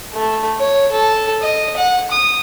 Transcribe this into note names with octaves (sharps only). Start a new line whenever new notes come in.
A3
C#5
A4
D#5
F#5
D#6